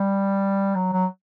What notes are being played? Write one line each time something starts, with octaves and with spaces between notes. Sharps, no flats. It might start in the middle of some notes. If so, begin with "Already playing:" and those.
Already playing: G3
F#3
F#3